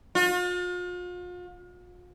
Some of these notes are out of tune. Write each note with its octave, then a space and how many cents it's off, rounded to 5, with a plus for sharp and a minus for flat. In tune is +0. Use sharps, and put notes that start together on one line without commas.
F4 +40